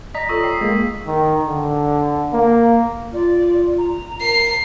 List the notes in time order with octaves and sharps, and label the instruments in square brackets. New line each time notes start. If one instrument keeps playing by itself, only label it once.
[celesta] D5 A#6 [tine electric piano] D#5 A#5 [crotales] B6
[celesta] F4 A4 C#5 [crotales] C#6 D#6 E6
[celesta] G5 [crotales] C7
[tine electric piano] G#3 A#3
[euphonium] D#3
D3
A#3
[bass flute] F4 [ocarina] D5
[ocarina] A#5
[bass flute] A#4 [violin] C7